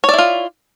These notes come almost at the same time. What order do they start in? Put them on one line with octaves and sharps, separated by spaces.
C#5 D5 E4 F4